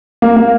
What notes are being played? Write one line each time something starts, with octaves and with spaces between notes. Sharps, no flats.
A#3
A#3